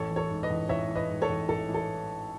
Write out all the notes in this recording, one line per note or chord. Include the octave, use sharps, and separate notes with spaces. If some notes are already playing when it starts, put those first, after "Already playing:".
Already playing: A1 A4 C#5
E3
A4 C#5
G#2
B4 D#5
A1
A1 C#5 E5
E3
B4 D#5
G#2
A4 C#5
A1
A1 A4
E3
A4